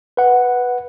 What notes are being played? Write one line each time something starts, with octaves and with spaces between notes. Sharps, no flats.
B4 F#5